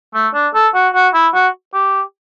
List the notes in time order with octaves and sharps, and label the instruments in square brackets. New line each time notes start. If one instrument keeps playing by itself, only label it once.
[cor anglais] A3
D4
A4
F#4
F#4
E4
F#4
G4